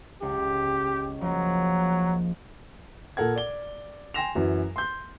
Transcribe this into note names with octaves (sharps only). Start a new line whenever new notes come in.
C#2 G4
F3 F#3 A#3
A#2 A4 A#4 F#5 G#6
D5 G7
G5 G#5 C6 A#6 E7 F7
F#2 E3 F#3
C6 G6